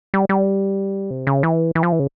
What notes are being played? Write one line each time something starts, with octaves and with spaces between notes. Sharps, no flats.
G3
G3
C3
C#3
E3
E3
F3
E3
C#3